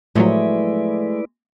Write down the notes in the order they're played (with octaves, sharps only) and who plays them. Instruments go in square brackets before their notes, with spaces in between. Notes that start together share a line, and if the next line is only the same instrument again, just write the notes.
[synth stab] A2 F3 F#3 [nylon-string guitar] G#3 A3 [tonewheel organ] E4 B4 D5